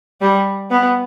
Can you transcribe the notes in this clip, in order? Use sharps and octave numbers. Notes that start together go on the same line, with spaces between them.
G3
B3